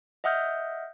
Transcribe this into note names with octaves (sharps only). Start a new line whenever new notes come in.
D#5 E5 F#5 D#6 F6 G6